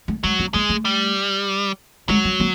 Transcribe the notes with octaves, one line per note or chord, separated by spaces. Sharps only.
A3
F#3 G#3
A#3
G#3 A#3
A3
G3
F#3 G#3
G3
A#3